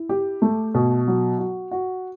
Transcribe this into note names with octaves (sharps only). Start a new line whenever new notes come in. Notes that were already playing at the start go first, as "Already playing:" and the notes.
Already playing: E4
G4
A3
B2
F#3
F#4
F#4